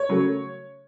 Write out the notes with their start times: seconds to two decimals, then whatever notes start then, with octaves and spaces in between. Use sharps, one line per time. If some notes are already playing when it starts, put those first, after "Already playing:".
Already playing: C#5
0.09 C#3 F#3 A3